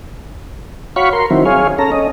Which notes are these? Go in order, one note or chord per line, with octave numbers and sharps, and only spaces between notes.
F#4 C#5 F5 B5 C#6
A#4 C6
D#3 F#3 C4 E4
G#4 C#5 F5
C#4 A4 A#5
C#4 D#5